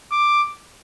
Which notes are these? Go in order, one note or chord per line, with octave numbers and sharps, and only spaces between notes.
D6